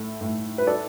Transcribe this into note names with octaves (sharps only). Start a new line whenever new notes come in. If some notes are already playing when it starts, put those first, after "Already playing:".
Already playing: A2 A4
A2
B4
A4 D5